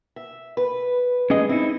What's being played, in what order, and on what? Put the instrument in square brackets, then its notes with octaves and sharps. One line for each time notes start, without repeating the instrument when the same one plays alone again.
[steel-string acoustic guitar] E5
B4
[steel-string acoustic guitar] G#3 [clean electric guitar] C#4 G#4 D#5
[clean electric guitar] C4 D#4 [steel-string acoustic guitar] E4